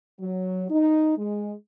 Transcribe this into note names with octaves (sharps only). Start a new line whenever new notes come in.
F#3
D#4
G#3